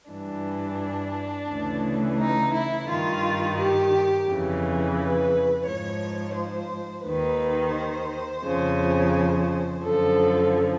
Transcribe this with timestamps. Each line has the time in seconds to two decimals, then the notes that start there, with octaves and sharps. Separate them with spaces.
0.11 G2 E3 D4
1.50 D2 C#3 E3
2.19 D#4
2.55 E4
2.89 G2 D#3 F4
3.59 G4
4.28 F2 C#3 E3
4.97 B4
5.67 G#2 F3 C#5
6.36 C5
7.06 D#2 D#3 B4
7.75 C5
8.44 F2 C#3 F3
9.84 F#2 D3 F3 A4